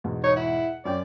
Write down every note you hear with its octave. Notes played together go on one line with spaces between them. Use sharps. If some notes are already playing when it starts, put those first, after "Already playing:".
E2 G#2 B2
D#4 C#5
E4 F#5
F#2 C#4 D5 G5